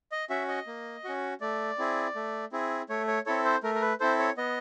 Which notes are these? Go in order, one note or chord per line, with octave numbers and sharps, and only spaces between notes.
D#5
C#4 F#4 E5
D#5
A#3
C#4 F#4
A3 D5
C4 E4 G#4
A3
C4 E4 G#4
A3 C#5
C#5
C4 E4 A4 C#5
C5
A3 A#4
A#4
B4
C4 E4 A4 C5
C#5
B3 D#5